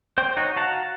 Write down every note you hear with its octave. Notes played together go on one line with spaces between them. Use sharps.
C5 G5 C6
D#4 F#4 C#5
F#4 F5 F#5 A5 A#5